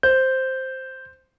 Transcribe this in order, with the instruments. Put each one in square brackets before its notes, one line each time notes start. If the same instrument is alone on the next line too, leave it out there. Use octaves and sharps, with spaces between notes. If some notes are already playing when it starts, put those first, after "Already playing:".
[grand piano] C5 [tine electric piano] G6